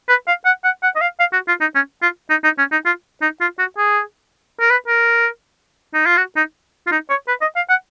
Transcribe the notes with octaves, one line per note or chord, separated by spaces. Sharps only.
B4
F5
F#5
F#5
F#5
D#5
F5
F5
F#4
F4
D#4
C#4
F4
D#4
D#4
C#4
D#4
F4
D#4
F4
F#4
G#4
A#4
B4
A#4
D#4
F4
F#4
D#4
F4
D#4
C#5
B4
D#5
F5
F#5